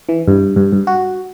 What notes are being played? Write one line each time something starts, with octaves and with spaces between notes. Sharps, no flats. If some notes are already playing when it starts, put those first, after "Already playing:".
E3
G2
G2
G2
F#4